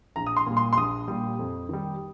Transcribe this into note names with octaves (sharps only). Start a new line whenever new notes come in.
A#1 A#5
D#6
C6
A#2 G3
C6
C6
A#1 D#6
A#2 G3
F2
D#3 G3